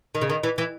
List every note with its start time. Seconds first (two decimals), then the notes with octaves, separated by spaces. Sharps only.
0.15 D#3
0.21 C#3
0.30 D#3
0.43 E3
0.58 E3